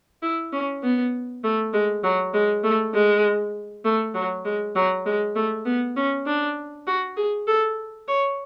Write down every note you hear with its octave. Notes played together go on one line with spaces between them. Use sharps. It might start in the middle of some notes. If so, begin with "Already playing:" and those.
E4
C#4
B3
A3
G#3
F#3
G#3
A3
G#3
A3
F#3
G#3
F#3
G#3
A3
B3
C#4
D4
F#4
G#4
A4
C#5